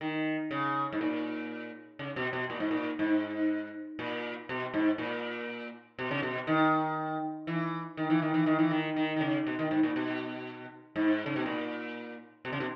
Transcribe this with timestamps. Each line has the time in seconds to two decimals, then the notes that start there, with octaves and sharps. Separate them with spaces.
0.01 D#3
0.51 C#3
0.93 G#2
1.01 A#2
1.99 C#3
2.16 B2
2.33 B2
2.50 A#2
2.60 G#2
2.71 A#2
2.99 G#2
3.99 A#2
4.49 B2
4.74 G#2
4.98 A#2
5.99 B2
6.11 C#3
6.23 B2
6.47 D#3
7.47 E3
7.97 D#3
8.10 E3
8.22 D#3
8.34 E3
8.46 D#3
8.59 E3
8.71 D#3
8.96 D#3
9.16 D#3
9.21 C#3
9.47 B2
9.59 D#3
9.71 G#2
9.83 A#2
9.96 B2
10.96 G#2
11.26 C#3
11.36 B2
11.46 A#2
12.45 B2
12.52 C#3
12.60 B2